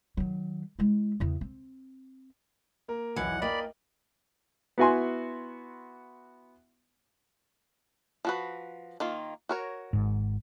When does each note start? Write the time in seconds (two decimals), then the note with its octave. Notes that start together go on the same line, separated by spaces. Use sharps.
0.17 D#3 F#3
0.79 G#3 E4
1.20 E2 C#3
1.41 C4
2.88 A#3 A#4
3.16 B1 E2 E3 F#5
3.42 A#3 A#4 D5 D#5 G5 B5
4.78 B3 E4 F#4 E5 G#5 C6
8.25 F3 F#4 B4
9.00 D#3 A#3 F4
9.49 F#4 A#4 C#5
9.93 G#1 G#2